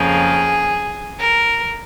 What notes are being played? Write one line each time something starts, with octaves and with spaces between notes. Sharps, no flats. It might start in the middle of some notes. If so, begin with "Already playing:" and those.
Already playing: F2 C#3 F3 A#3 G#4
A#4